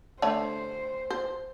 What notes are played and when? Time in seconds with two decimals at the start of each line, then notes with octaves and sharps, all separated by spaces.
0.22 D3 A3 C5 C#5
1.10 C5